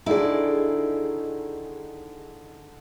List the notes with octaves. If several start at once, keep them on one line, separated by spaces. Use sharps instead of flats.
D3 D#3 D#4 E4 G#4 D5